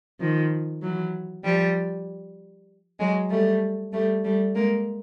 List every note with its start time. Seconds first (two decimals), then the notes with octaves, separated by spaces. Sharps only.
0.20 D#3 F3
0.82 E3 F#3
1.44 F3 G3
3.00 F#3 G#3
3.31 G3 A3
3.93 G3 A3
4.24 G3 A3
4.55 G#3 A#3